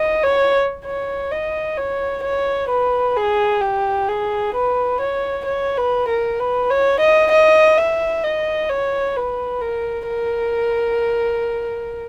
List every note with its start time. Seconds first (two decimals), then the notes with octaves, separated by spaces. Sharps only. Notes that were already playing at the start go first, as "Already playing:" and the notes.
Already playing: D#5
0.23 C#5
0.85 C#5
1.31 D#5
1.77 C#5
2.23 C#5
2.69 B4
3.16 G#4
3.61 G4
4.08 G#4
4.54 B4
5.01 C#5
5.46 C#5
5.78 B4
6.09 A#4
6.39 B4
6.70 C#5
7.00 D#5
7.32 D#5
7.77 E5
8.24 D#5
8.69 C#5
9.16 B4
9.61 A#4
10.09 A#4